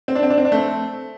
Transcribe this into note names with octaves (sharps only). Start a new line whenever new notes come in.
C4
D4
C4
D4
C4
D4
A3 C4